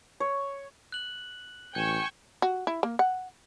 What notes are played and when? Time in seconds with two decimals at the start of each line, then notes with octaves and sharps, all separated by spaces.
0.20 C#5
0.92 F#6 F#7
1.75 A1 G5 G#5 C#6 G6 E7
2.42 F#4
2.67 E4
2.83 A#3
2.99 F#5